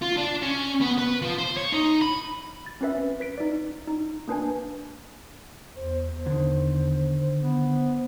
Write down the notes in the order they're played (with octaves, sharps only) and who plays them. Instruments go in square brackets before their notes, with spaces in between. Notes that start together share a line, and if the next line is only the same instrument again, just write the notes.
[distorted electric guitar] F4
D4
C#4
B3
B4
F3
C5
C#5
D#4
B5
[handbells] A6
C4 C#4 B4 E5
B4 B6 D7
D#4 D5
D#4
A#3 D4 B4 G#5
[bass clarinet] E2 [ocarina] C5
[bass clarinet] E2 [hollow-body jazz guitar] D3 D#3
[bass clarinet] B3